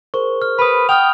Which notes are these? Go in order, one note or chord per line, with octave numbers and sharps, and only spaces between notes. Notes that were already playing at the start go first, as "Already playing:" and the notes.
G#4 A#4 C5 C#6
F6
B4 B5 D#6
F#5 G5 D#6 F6 F7